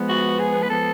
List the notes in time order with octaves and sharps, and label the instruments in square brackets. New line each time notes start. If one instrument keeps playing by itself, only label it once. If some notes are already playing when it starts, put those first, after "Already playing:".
Already playing: [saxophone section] F3 G#3 B3
[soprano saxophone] F#4
G#4
B4
[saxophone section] F3 G#3 B3 [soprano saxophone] A4